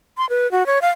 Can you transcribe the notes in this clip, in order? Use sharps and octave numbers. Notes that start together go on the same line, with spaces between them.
C6
B4
F#4
C#5
F5